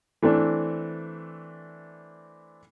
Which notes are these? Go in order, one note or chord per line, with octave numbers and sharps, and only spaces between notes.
E3 A3 C4 D4